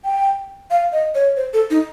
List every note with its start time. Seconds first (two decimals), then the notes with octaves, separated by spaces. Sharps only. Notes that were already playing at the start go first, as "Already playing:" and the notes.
0.05 G5
0.71 F5
0.92 D#5
1.15 C#5
1.37 C5
1.53 A4
1.71 D#4